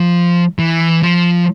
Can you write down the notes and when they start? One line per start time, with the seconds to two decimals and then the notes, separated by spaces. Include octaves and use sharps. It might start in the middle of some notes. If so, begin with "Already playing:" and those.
Already playing: F3
0.59 E3
1.03 F3